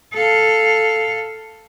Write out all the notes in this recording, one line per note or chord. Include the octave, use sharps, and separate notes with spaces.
A4 F5